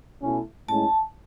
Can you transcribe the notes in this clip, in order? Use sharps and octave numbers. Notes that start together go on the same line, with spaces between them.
B2 A3 C#4 E4
A2 G#3 C#4 E4 A5